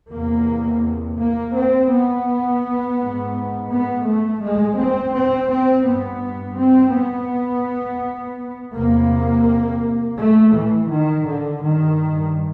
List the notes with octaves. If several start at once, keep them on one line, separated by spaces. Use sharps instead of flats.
E2 C3 A#3
A#3
C4
B3
G#2
B3
A3
G#3
C4
C4
C4
G2 B3
C4
B3
E2 C3 A#3
A3
E3
D#3
D3
G2 D#3